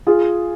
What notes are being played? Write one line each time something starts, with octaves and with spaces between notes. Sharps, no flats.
F4 G#4